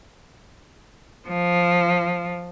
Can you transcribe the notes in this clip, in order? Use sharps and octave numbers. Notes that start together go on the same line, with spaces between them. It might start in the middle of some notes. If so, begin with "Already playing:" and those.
F3